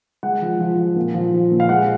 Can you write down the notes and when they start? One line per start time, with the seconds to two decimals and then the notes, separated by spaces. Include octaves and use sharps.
0.23 G#3 F#5
0.41 F3
0.60 F3
0.78 F3
0.96 A#2
1.14 F3
1.33 F3
1.51 A#2
1.60 F5
1.69 G#3 F#5